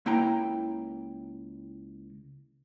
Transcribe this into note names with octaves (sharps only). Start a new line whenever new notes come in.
C#2 A#3 E4 G5 A#5